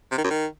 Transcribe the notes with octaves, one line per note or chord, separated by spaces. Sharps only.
C3
D#3
F#2
D#3